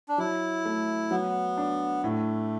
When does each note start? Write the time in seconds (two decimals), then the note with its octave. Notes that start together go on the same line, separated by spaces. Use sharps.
0.09 D4
0.18 F#3 E4
0.65 A3
1.11 F#3 B3
1.57 D4
2.03 A2 A3